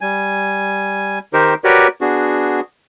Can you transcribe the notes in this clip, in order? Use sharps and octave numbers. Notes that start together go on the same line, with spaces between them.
G3 G#5
D#3 D#4 G4 A#4 C5
F#4 G4 A#4 B4 C#5 D5
B3 D4 F#4 G#4